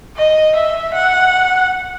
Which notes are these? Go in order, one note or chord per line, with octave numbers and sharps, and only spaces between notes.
D#5
E5
F#5